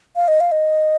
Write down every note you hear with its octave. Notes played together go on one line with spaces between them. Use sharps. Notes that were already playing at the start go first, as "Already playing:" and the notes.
F5
D#5
F5
D#5